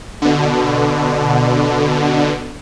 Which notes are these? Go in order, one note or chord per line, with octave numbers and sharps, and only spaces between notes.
B2 D3